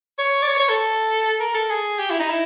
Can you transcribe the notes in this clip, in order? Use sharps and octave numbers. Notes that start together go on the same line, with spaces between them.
C#5
D5
C#5
C#5
A4
A#4
A4
G#4
G4
E4
D#4
E4